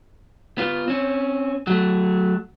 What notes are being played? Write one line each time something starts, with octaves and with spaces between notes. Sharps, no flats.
B3 F4
C4 C#4
F#3 A3